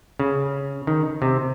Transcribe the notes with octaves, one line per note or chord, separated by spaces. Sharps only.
C#3
D#3
C3